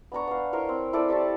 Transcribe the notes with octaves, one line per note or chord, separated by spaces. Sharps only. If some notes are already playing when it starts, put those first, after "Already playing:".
B3 D4 A#5 C#6
B3 F5
E4 A#4 C5 C#5
C4
E4 A4 D5 E5
G4 D5 A5 C#6